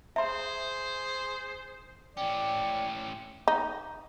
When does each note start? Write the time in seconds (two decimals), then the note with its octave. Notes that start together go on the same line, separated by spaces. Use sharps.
0.16 G#4 C5 E5 C6
2.17 A2 C#4 D5 G5
3.48 D#4